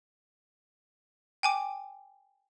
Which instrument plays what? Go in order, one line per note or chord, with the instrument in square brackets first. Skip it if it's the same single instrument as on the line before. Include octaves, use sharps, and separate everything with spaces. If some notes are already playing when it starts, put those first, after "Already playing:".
[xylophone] G5 G#5 D6